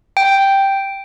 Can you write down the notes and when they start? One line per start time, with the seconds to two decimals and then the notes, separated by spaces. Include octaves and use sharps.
0.17 G5